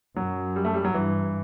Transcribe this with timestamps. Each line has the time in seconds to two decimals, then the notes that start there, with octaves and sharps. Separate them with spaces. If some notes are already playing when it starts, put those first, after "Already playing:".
0.16 F#2 F#3
0.56 G3
0.65 A3
0.74 G3
0.85 F#3
0.94 G2 E3